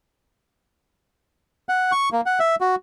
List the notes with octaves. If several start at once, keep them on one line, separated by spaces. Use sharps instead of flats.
F#5
C#6
A#3
F#5
E5
F#4